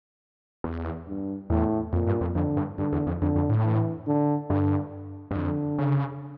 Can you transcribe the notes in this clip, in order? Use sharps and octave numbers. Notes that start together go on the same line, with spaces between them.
E2
G2
E2 A2
F2 A#2
G2
F2
F2 D3
G2
G2 D3
E2
F2
F2 D3
F2
A2
E3
D3
G2 D3
G2
F2 D3
C#3